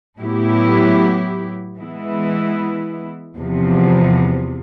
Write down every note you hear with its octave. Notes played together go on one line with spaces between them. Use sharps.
A2 F#3 B3 E4 G4
E3 G#3 B3 E4
E2 C3 F3